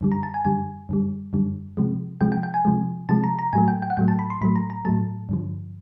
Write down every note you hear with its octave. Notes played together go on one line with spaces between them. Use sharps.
F#2 D3 G3
A#5
A5
G#5
F#2 D3 G3 G#5
F#2 D3 G3
F#2 D3 G3
C3 F3 G#3
C3 F3 G#3 G5
G5
G5
G#5
C3 F3 G#3
C3 F3 G#3 A5
A#5
A#5
A2 F#3 A3 G#5
G5
G5
F#5
A2 F#3 A3 G5
A5
B5
C6
A2 F#3 A3 B5
A#5
A#5
A2 F#3 A3 A5
G2 D3 F3